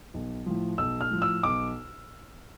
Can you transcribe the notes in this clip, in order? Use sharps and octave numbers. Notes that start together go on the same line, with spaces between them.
B1
A2 F3
B1 E6
F6
A2 F3
E6
B1 D6